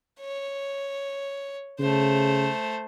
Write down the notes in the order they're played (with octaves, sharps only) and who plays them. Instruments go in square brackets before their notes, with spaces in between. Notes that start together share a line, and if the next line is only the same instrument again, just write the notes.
[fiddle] C#5
[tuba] C#3 [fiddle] A3 C5